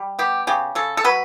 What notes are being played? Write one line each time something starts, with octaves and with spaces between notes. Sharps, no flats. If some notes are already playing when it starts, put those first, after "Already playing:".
Already playing: G3
B3 G4
C#3 G4
C#3 A4
A4
F#3 B4